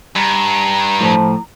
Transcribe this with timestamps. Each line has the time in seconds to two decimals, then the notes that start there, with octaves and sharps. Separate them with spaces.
0.16 G2 A#5
1.01 A2 F3